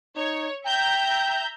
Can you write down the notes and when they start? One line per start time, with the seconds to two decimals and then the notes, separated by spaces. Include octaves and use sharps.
0.16 D#4 C#5
0.66 E5 G5 A#5 G6